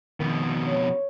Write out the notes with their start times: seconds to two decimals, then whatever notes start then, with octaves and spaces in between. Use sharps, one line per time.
0.20 F2 B2 D#3
0.67 C#5